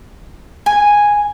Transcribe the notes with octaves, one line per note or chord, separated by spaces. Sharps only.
G#5